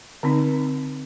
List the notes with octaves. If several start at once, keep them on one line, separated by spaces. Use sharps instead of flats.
D3 C4 D#4